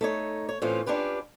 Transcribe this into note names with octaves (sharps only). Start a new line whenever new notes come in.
A3 D#4 C#5
C#5
A2 E3 C4 C#4 F4
C#4 D4 F4 G4 B4